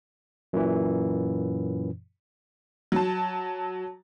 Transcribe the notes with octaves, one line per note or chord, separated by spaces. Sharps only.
F#2 A#2 E3
F#3 A5